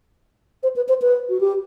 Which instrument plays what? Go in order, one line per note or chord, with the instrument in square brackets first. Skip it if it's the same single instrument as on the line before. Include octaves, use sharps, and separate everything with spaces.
[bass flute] C5
B4
C5
B4
F#4
G4